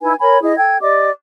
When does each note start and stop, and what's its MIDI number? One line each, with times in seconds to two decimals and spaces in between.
0.01 0.14 63
0.01 0.14 64
0.01 0.14 71
0.01 0.14 80
0.20 0.38 70
0.20 0.38 73
0.20 0.38 80
0.20 0.38 83
0.42 0.55 64
0.42 0.55 68
0.42 0.55 75
0.56 0.77 69
0.56 0.77 79
0.56 0.77 92
0.81 1.10 67
0.81 1.10 74
0.81 1.10 75
0.81 1.10 86